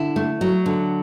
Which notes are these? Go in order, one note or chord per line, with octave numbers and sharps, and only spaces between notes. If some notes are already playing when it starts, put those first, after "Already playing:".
Already playing: D3 E4
A3
F#3
D3